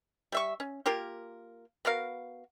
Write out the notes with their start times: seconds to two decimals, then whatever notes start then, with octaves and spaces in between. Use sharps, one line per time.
0.32 G3 E5 C#6
0.60 C#4
0.86 A#3 F4 G4 A#4
1.85 B3 F#4 A#4 F5